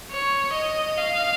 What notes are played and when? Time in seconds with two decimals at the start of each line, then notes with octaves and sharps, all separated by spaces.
0.11 C#5
0.53 D#5
0.97 F5